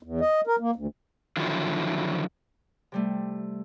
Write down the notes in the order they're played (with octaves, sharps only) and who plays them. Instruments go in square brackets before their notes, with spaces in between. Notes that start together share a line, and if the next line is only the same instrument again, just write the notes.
[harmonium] E2
D#5
A#4
A#3
D2
[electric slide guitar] D3 D#3 F3 F#3 E4 F4
[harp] C3 G3 A3